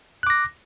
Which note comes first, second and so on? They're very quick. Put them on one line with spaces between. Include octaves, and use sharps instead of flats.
F#6 D6 A#6